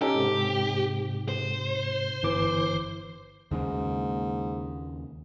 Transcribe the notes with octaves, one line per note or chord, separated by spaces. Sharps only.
C#4 D#4 G4 A4
G#2 C3
C5
G1 E3 D6
D#2 G#2 C#3 A#3